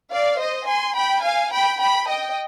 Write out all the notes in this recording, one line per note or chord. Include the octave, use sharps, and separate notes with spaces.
D5 F5
C5 D#5
G#5 C6
G5 B5
F5 G#5
G5 B5
G5 B5
D#5 G5